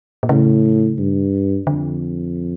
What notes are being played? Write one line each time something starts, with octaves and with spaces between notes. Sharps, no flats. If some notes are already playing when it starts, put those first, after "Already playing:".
A#2
A2 C#3
G2
F2 D3